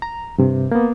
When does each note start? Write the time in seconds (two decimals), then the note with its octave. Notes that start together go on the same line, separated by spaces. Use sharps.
0.02 A#5
0.38 G2 C3
0.71 A#3 B3